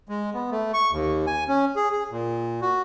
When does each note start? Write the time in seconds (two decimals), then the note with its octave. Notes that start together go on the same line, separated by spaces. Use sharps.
0.09 G#3
0.34 B3
0.51 A3
0.74 C#6
0.92 D#2
1.27 G#5
1.48 C#4
1.76 G#4
1.92 G#4
2.11 A#2
2.62 F#4